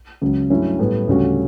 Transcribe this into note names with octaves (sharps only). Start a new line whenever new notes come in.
C#2 C#3 F#3
G2 F#3 A3 C#4 E4
A2 G3 B3
D2 C#3 G3 C#4 F#4